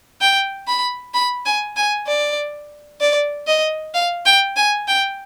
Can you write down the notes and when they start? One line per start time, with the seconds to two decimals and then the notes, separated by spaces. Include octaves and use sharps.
0.21 G5
0.67 B5
1.14 B5
1.46 G#5
1.76 G#5
2.07 D5
3.01 D5
3.47 D#5
3.94 F5
4.25 G5
4.56 G#5
4.88 G5